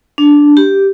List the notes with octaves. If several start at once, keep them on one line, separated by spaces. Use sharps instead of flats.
D4
G4